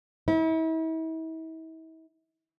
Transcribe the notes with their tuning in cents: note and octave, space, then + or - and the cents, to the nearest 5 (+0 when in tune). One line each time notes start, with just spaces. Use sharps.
E4 -40